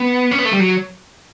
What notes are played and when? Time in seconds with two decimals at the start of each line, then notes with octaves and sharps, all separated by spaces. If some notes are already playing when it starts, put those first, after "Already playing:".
Already playing: B3
0.31 C#4
0.39 B3
0.45 A3
0.52 G3
0.60 F#3